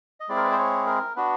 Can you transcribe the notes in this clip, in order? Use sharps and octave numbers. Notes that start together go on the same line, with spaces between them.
D#5
G#3 C4 E4 G#4 D5
A#4
B4
C5
C#5
A#4
B3 D4 F#4 B4